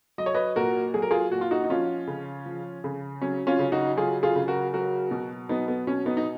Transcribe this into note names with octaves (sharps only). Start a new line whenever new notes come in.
F#3 D#5
C#5
B4 D#5
A#2 F#4 A#4
F#3 G#4
A#4
F4 G#4
A#2 F#4
F4
D#4 F#4
D#4
F3 C#4 F4
C#3
F3
C#3
F#3 C#4
C#4 F4
C#3
D#4 F#4
F#3 F4 G#4
F4 G#4
C#3
F#4 A#4
F#3 F#4 A#4
B2
F#3 B3 D#4
B3
B2 C#4
B3 D#4
D#4